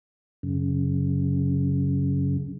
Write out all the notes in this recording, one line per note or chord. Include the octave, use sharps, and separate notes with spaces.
F#2 C#3